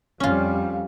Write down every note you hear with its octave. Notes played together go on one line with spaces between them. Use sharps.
F2 G3 C#4 F4